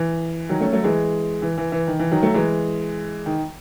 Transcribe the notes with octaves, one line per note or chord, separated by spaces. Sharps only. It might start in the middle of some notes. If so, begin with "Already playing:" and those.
Already playing: E3
D#3 F#3
A3 C#4
F#3 A3
E3 G#3
E3
E3
E3
D#3
E3
D#3 F#3
F#3 A3
E3 G#3
D#3